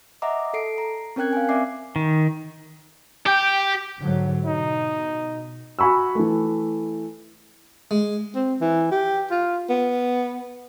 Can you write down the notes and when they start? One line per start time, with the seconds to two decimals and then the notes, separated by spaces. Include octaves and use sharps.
0.22 D#5 E5 F#5 A#5 D6
0.54 A4 C7 D7
0.78 A#5
1.16 C4 C#4 A#4 G5 F#6 G#6
1.33 F5 G#5
1.49 C4 D5 E5 G#5 D6 C7
1.96 D#3
3.26 G4 G5
3.98 G#2 D3 F#3
4.46 B2 D#4
5.79 F#4 G#5 B5 C#6 E6
6.15 E3 A3
7.91 G#3
8.35 C4
8.61 E3
8.91 G4
9.31 F4
9.69 B3